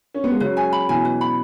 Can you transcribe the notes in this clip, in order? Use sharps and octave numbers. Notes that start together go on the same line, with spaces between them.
C#4
B3
G#3
C#3 F#3 B4
G#5
B5
B2 E3 G#5
B4
B5